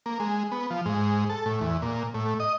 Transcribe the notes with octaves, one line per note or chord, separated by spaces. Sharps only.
A#3
G#3
B3
F3
G#2
A4
A2
E2
A#2
A2
D#5